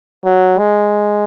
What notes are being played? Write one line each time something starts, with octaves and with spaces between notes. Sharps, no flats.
F#3
G#3